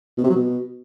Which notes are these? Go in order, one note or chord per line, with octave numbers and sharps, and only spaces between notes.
B2
C3
F#3
B2